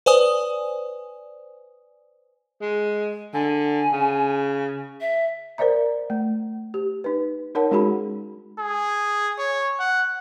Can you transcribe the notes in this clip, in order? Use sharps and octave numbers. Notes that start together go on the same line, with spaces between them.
B4 C5 D5 G#5 D#6
G#3
D3 G#5
C#3
E5
A#4 C5 D5 E5 A#5
A3
G4
D#4 B4
D#4 A#4 C#5 F#5 A5
G#3 C#4 D#4 F#4 G#4 B5
G#4
C#5
F#5